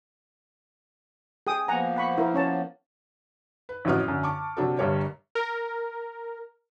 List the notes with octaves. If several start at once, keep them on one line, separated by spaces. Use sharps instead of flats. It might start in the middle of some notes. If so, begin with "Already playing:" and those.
G#4 G5 D#6
F3 A#3 B3 F#5 G#5 A#5
F#5 B5 C#6
E4 A#4
C#4 C#5 A5
B4
A1 F2 A2 F#3 B4 F6
F#2 D3
A5 C#6 D6
C3 F#3 D4 F#4 A4
G1 G2 G3 A#4 C#5
A#4